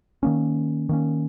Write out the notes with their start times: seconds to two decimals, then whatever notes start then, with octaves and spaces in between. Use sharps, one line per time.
0.23 D#3 A#3 C#4
0.89 D#3 A#3 C#4